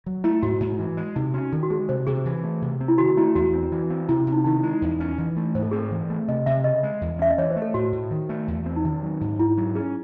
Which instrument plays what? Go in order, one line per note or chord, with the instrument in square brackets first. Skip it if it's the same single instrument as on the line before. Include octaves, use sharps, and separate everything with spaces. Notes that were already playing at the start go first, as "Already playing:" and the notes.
[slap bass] F#3
[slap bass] A3 [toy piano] E4
[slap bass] G#2 [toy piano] F#4
[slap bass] G#2
E3
G#3
[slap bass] C3 [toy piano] D#4
[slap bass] C#4 [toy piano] F#4
[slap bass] D#3 [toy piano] A4
[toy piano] F#4
[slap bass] G#3 [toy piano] G#4
[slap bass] C3 [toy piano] C5
[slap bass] C3 [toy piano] G#4
[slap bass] E3
A3
C3
C4
[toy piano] E4
[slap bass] D#3 [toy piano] F#4
[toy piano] F#4
[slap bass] A3 [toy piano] E4
[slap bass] E2 [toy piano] F#4
[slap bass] C4
E3
C4
[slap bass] C3 [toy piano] E4
[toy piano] C#4
[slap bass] C3
[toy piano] D#4
[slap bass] D#3 [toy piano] D#4
[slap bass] G#3 [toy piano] E4
[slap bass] E2
C#4
E3
A3
[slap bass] G#2 [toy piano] C5
[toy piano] A4
[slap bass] C4 [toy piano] G#4
[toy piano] A4
[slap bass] E3
A3
[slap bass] C3 [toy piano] D#5
[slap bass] C3 [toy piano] E5
[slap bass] C#3 [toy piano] D#5
[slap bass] G#3
E2
[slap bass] C#4 [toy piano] E5
[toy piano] D#5
[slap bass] E3 [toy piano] C#5
[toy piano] C5
[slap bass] A3
[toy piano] A4
[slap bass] A2 [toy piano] F#4
[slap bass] A2
D#3
A3
E2
C4
[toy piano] D#4
[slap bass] D#3 [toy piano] C#4
[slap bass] F#3
[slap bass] G#2 [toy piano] D#4
[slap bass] G#2 [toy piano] E4
[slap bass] F#3
[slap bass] C#4 [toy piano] G#4